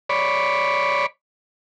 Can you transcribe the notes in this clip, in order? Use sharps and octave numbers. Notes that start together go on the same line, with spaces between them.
C#5 D5 B5